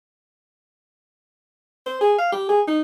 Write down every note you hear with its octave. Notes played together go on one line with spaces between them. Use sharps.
C5
G#4
F5
G4
G#4
D#4